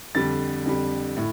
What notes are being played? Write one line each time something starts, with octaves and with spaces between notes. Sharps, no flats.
F2 D3 G3 A6
F2 D3 G3
A2